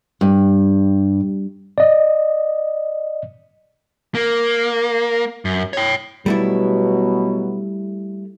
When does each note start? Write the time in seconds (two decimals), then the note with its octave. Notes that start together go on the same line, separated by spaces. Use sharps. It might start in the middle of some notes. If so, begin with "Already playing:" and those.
0.21 G2
1.78 D5 D#5
4.15 A#3
5.45 F#2
5.73 C#5 G5
6.26 B2 F#3 G3 A3 B3 E4